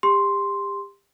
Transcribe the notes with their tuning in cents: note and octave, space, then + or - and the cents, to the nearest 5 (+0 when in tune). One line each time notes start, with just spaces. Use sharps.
G4 +30 C6 +0